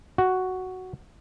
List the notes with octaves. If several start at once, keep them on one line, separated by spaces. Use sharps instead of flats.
F#4